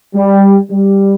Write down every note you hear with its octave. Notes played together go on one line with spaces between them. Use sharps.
G3
G3